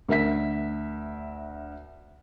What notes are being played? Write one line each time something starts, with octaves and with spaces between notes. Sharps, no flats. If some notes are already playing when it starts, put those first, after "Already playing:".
D2 A#4 E5 B6